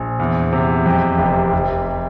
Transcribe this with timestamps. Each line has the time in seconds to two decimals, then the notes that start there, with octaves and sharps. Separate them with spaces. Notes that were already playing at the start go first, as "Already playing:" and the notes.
Already playing: A#1
0.19 E2
0.53 C3
0.86 F2
1.18 F1
1.52 F1